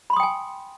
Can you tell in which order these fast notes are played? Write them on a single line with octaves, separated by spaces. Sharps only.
B5 C6 D#6 G5 G#5